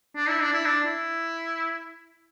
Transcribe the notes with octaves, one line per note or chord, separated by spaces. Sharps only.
D4
E4
D4
E4
D4
E4